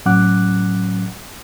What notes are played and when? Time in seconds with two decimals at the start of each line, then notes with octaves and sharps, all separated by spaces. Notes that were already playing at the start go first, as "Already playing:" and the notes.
0.06 A2 F#3 C#4 F#5 D6 F#6